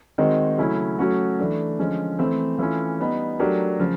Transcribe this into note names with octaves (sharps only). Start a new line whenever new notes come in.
D#3 G#3 C4 D#4 F#4
C#3 F#3 A3 C#4 E4
F#3 A3 C#4 F#4
E3 A3 D4
D3 F3 G#3 C#4
E3 A3 C4
E3 A3 C#4 F4
G3 B3 D#4
F#3 A3 D4 G4 A#4
C#3 F3